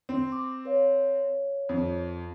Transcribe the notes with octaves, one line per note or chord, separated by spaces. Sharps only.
C4
D6
B4 C#5 F5
F2